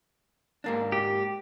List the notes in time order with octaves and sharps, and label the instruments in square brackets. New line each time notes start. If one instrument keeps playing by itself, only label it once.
[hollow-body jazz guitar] G#2 A#3 D4
[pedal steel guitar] G4